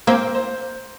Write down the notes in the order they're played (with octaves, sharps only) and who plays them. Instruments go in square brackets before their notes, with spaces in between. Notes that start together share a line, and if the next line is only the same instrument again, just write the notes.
[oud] A#3 C4 [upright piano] C5
[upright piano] C5